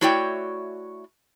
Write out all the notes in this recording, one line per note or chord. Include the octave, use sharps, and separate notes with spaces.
A3 E4 F#4 C#5 D5 G5